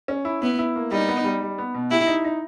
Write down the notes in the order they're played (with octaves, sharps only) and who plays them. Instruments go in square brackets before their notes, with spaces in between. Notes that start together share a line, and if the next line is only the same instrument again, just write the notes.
[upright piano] C#4
E4
[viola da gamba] B3 [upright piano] E4
[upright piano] E4
A#3
[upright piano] G3 [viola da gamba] D#4
[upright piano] B3
G3
G3
B3
B2
[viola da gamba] E4 [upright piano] G4
[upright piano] D#4
D#4